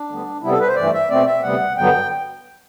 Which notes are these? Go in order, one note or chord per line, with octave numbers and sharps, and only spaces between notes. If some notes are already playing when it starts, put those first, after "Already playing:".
Already playing: D4
D2 D3 G3 B3
C3 G3 B3 E4
A4
B4
C5
G2 E3 A3 D5
E5
B2 A3 C4 D5
E5
D2 C3 G3 B3 F#5
G2 D3 F#3 B3 G5